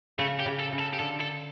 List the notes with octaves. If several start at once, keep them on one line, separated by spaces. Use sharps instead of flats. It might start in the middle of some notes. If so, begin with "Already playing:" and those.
C#3 A3
G4
C#3
A4
C#3
A4
G4
D3 A4
A4